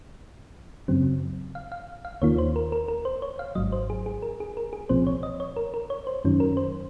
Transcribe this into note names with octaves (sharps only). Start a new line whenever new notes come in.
F#2 C#3 F#3 C4
F5
F5
F5
D#2 D#3 A#3 F4 C#5
C5
A#4
A#4
A#4
C5
C#5
F5
G#1 G#2 F#3 D#5
C5
G#4
G#4
A#4
G#4
A#4
G#4
C2 A#2 F3 C4 C5
C#5
D#5
C#5
A#4
A#4
C#5
C5
F#2 D#3 F#3 C#4
A#4
C5